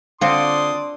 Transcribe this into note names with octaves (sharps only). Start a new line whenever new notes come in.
D3 C4 F4 D5 C6 D#6